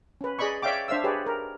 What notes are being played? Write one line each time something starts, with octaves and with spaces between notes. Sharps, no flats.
C#4 B4
G#4 D5 D#5 B5 C#6
C#5 D5 E5 F5 G5 D6
D4 C5 E5 F5 E6
G4 G#4 B4 C#5 D5
A#4